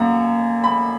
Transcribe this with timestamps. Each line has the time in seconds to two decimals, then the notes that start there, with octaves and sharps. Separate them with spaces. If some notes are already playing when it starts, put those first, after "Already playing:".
Already playing: F#2 A#3 F#5 A#5
0.64 B5